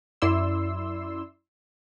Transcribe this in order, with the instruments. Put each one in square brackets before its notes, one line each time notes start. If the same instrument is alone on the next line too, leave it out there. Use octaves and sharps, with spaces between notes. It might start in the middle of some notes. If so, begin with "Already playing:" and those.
[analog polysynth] F#2 E4 D5 C6 E6